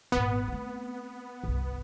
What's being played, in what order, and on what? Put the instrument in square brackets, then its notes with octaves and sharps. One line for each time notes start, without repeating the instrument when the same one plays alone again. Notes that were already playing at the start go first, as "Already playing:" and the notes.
[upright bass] G#1 A#2 [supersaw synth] B3
[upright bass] A3 C4
G1 C2